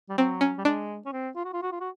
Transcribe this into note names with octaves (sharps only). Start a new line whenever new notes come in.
G3
F#3 C4
C#4
G3
G#3 D4
C#4
C4
F4
F#4
F4
F#4
F4
F#4